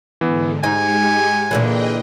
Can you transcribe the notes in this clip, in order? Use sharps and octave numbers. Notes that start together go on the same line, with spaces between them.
G#2 D3 E3 B3
G#2 G#3 D#4 G4 G#5 C#7
A#2 D3 E3 G#4 D#5 G5